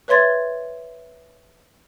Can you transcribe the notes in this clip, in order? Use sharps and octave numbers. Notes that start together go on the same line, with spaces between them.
B4 C#5 E5 C6 G#6 A6